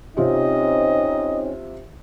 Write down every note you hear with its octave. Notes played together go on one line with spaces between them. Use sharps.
C3 C4 C#4 D#4 F4 G4 D#5